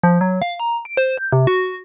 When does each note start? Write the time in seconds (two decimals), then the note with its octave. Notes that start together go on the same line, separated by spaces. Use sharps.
0.03 F3
0.21 F#3
0.42 F5
0.60 A#5
0.85 D7
0.97 C5
1.18 G6
1.32 C3
1.47 F#4